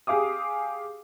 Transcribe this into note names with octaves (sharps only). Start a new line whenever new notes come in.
G4 G#4 F5 D6 D#6